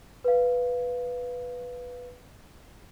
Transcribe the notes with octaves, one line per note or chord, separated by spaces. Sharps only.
B4 F5